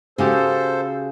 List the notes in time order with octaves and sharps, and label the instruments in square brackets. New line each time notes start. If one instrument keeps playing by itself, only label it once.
[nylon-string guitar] C#3 F#4 G4 [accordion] A4 C5